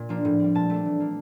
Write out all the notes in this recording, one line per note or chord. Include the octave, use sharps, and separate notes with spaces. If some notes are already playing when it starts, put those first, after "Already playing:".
Already playing: A#2
F3 A#3 D4
A2
G3 C4
A#2 A5
A3 D4
E3
A#3 D4